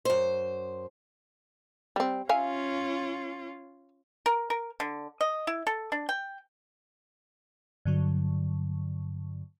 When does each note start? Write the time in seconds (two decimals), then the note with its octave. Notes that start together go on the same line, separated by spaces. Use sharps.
0.05 F#2 C5
1.96 G3 C4
2.29 C#4 F4 E5 F5 G#5
4.26 A#4
4.50 A#4
4.80 D3
5.21 D#5
5.47 E4
5.67 A4
5.92 D4
6.09 G5
7.85 G2 D3 F#3